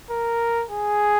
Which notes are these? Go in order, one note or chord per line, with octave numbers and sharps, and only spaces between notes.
A#4
G#4